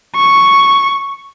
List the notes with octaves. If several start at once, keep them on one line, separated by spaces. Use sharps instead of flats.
C#6